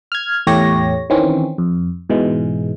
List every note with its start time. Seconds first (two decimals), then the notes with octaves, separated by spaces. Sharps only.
0.12 F6 G#6
0.47 E2 A2 A3 G4 C#5 A#6
1.10 D#3 E3 C4 C#4
1.58 F2
2.10 G#2 B2 E3 G#3